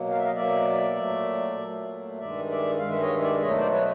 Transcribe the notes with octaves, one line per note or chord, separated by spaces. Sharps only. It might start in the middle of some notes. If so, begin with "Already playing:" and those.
Already playing: B2 F#3 A#3
F5
E5
D#5 F5
B2 F#3 A#3 D5 E5
A#2 F#3 A3
A#2 F#3 A3
G2 D#3 G#3 D5 E5
D5 E5
G2 D#3 G#3 F5
E5
C#5 D#5
D5 E5
B2 F#3 A3 C#5 D#5
C5 D5
B4 C#5